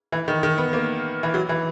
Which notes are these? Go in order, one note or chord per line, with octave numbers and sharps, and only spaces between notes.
E3
D#3
D#3
B3
A#3
E3
F#3
E3